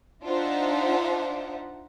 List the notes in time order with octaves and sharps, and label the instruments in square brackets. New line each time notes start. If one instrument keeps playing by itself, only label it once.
[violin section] D4 D#4 F4 C5 E5 F#5